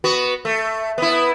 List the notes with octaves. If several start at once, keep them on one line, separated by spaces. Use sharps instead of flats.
B3 F#4
A3
B3 E4